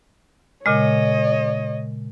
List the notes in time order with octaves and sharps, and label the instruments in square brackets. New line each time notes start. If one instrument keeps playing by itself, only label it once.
[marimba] A#2 C#3 G#3 [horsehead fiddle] C#5 D#5